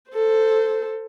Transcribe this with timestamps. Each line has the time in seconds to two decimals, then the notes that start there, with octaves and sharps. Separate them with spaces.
0.11 A4 C5